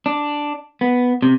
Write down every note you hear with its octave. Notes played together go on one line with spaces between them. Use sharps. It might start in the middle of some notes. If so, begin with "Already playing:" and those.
D4
B3
C3